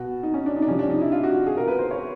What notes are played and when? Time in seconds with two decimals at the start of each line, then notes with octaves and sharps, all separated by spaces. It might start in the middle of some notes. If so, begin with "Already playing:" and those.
Already playing: B2 F#4
0.23 D#4
0.34 C#4
0.46 D4
0.56 D#4
0.62 D4
0.68 C3 F3 C#4
0.79 D4
0.89 D#4
1.01 E4
1.12 F4
1.23 F#4
1.46 G#4
1.57 B2 A#4
1.68 B4
1.79 C5
1.91 C#5